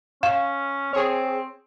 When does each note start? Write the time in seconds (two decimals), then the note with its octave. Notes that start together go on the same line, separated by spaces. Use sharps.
0.23 C#4 F5
0.93 C4 G#4 C#5